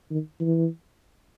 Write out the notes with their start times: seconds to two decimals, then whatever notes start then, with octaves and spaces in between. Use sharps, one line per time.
0.11 D#3
0.40 E3